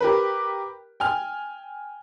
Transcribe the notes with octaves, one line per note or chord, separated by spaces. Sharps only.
G4 A#4 B4
G5 G#5 F6